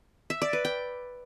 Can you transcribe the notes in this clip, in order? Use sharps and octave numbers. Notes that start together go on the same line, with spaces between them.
E5
D5
B4
G5